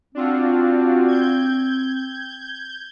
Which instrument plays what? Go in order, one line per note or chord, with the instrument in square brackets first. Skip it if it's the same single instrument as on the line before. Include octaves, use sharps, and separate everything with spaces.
[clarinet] C4 [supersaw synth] D4 F4 F#4
[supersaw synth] G6 G#6